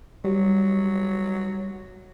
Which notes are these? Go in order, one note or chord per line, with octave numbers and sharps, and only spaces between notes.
F#3 G3